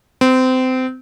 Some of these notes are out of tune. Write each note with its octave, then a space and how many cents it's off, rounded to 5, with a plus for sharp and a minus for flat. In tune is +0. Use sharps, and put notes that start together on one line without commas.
C4 -25